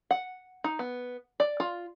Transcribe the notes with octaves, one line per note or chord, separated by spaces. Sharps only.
F#5
D#4
B3
D5
F4